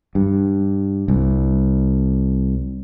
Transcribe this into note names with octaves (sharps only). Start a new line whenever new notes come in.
G2
C2